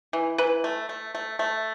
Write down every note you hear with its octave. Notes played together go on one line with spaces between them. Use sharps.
E3
E3 B4
A3
A3
A3
A3